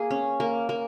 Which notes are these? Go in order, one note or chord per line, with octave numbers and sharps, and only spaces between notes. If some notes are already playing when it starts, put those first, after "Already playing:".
Already playing: A#3 G#4
C#4
A#3
A#3